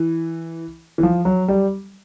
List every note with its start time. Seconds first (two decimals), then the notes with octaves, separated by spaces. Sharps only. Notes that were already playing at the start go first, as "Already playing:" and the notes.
Already playing: E3
0.98 E3
1.03 F3
1.25 F#3
1.48 G3